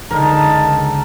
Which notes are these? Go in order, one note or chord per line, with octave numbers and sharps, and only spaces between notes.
C#2 D3 D#4 A#4 A5